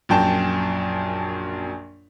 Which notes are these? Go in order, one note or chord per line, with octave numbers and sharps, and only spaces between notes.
A#1 F#2 G5 A5